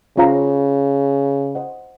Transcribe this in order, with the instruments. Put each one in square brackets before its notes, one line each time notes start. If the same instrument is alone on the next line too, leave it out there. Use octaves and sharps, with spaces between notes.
[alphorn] C#3 [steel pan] C#4 F4 C5 F5 A#5
[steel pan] C5 D#5 F#5